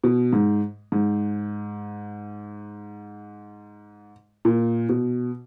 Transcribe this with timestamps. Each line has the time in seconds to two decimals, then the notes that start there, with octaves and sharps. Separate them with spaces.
0.04 B2
0.33 G#2
0.92 G#2
4.45 A#2
4.89 B2